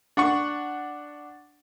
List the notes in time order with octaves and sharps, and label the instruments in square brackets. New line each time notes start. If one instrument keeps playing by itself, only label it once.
[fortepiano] D4 F#5 C#6